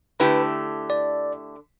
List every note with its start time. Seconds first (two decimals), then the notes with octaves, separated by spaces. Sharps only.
0.20 D3 A3 E4 G4 B4
0.90 D5